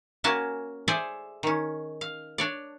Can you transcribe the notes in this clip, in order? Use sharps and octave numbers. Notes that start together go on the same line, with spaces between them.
A#3 C#4 F#4 G#5 A5
G#4 A4 C5 D5 E5 G#5
D#3 C#4
F5
D4 C#5 D5